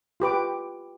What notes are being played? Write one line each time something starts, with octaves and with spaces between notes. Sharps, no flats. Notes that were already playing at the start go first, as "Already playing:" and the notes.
F4 G4 B4 D6